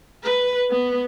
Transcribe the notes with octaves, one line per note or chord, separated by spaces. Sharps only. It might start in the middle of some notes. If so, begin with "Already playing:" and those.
B4
B3